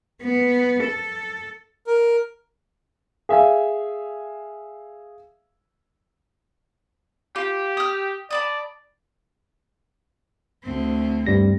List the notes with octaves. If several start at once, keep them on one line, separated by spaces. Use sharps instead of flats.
B3
A4
A#4
G#4 E5 F5 G#5
F4 G4
D#6 F6
D5 A5 B5 D#6
D2 C4
G2 G3 A#6